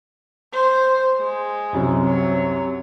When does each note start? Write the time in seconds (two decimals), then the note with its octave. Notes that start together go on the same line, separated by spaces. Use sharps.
0.53 C5
1.19 G#3
1.73 C2 F#2 C3
2.05 F#3